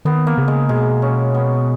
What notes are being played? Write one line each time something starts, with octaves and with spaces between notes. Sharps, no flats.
D#3 B3
A#3
C#3
G#3
B2 G#3
C#4
B3